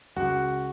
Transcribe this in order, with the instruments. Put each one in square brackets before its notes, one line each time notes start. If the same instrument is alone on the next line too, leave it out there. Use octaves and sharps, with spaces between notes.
[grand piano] C#2 F#4